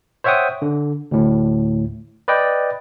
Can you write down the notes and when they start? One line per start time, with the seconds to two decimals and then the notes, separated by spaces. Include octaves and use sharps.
0.24 C5 C#5 E5 F#5 G5 D#6
0.62 D3
1.11 D2 A2
2.28 B4 D5 D#5 G5